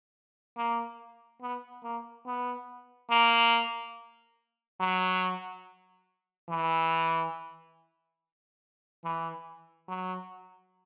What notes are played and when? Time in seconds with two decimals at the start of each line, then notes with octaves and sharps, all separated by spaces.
0.57 A#3
1.42 B3
1.83 A#3
2.26 B3
3.10 A#3
4.80 F#3
6.49 E3
9.04 E3
9.88 F#3